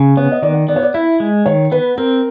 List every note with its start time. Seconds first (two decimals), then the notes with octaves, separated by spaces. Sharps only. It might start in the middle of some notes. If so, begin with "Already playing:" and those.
Already playing: C#3
0.17 B3 C#5
0.32 D#5
0.42 D#3 D5
0.68 B3 D5
0.76 C#5
0.83 D5
0.94 E4 E5
1.20 G#3
1.46 D#3 C#5
1.71 B3 B4
1.98 C4 A#4